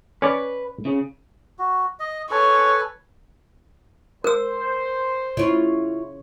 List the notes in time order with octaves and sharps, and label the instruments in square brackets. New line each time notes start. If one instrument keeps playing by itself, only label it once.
[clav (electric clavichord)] C#4 C#5 D5 [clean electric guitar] B4
[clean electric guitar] C#3
[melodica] F#4
D#5
[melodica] A4 B4 G#5 [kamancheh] C#5
[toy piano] A#4 E6 [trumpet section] C5
[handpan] C#3 C#5 [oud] E4 F4